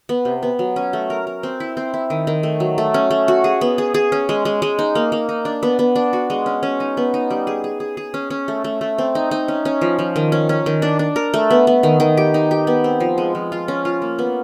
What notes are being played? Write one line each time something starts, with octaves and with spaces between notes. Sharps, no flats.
B3
C3
B3
F#3
C#4
A3
A#4
A#4
C4
E4
C4
E4
D#3
D#3
A3
F#3
A3
C#4
A3
F#4
G#4
B3
G#4
G#4
C#4
G#3
G#3
G#3
D#4
A#3
A#3
D#4
D4
B3
B3
D4
F#4
G#3
C#4
C#4
D#4
B3
D#4
G3
G#4
G#4
G#4
G#4
C#4
C#4
A3
A3
A3
C4
D#4
D#4
C#4
C#4
F3
F3
D#3
C#4
C#4
D#3
D4
D4
A#4
A3
B3
B3
D#3
D#3
G4
D#4
G4
B3
C4
F3
G#3
F3
F4
C#4
F4
A#3
B3